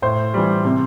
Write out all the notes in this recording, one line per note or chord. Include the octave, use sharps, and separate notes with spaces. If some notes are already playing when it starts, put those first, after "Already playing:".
A2 C5
E3 G3
C3